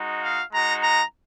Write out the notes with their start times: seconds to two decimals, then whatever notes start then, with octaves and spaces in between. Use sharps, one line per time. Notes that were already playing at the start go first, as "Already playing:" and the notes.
Already playing: G#3 D#4 F#4
0.23 F5
0.53 G#3 D#4 F#4 A#5
0.83 A#5